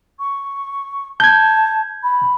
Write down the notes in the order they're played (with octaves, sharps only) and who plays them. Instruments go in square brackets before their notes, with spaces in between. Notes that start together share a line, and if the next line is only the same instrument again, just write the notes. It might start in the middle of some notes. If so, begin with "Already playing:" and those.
[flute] C#6
[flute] A5 [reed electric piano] G6 G#6
[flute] B5